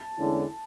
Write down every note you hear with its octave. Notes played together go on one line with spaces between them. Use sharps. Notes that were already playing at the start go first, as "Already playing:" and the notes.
Already playing: A5
E2 D3 G#3 C#4 E4